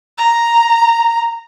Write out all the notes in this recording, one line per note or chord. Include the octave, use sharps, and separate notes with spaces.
A#5